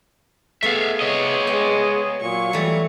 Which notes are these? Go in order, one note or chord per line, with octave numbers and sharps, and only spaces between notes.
A3 B3 G#4 A4 E5 F5
C#5 D#5
G#3 G5
A#2 F#3 C#6
E3 G3 A3